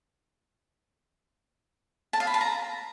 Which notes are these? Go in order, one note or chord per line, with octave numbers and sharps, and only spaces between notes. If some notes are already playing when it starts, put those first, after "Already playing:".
A5
F5
B5
A5
A#5